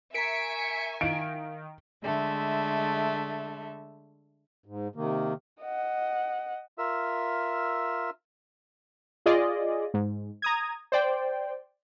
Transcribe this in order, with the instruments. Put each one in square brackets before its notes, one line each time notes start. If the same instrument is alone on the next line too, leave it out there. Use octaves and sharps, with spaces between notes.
[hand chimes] A#4 A#5 [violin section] E5 G#5 C#6 [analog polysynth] B6 C#7 D7
[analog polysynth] D#3 [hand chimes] F5 [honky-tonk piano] D7
[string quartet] D3 G#3 A3 E5
[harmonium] G#2
C3 D#3 A#3
[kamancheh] D#5 F#5
[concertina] F4 A#4 E5 E6
[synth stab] F4 G#4 D5 D#5
G#2
A#5 D#6 G#6
C5 D5 G5